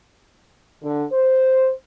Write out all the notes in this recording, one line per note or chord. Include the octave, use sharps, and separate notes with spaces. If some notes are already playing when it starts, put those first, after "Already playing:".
D3
C5